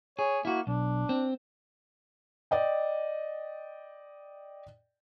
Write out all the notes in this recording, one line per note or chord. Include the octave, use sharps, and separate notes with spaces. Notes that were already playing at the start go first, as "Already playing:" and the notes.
G#4 C#5
A#3 E4 F#4
B1 D4
C4
D5 D#5 G5